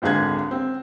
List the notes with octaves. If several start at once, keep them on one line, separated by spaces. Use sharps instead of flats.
G#1 C#2 D3 G#4 F#6 G#6
C4